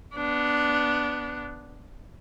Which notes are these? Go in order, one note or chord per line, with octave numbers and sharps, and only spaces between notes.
B3 D4